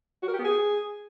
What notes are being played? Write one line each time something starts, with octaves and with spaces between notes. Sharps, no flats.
F#4
A#4
G4
B3
G#4